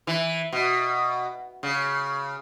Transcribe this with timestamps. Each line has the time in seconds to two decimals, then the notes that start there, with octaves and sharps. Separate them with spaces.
0.07 E3
0.53 B2
1.63 C#3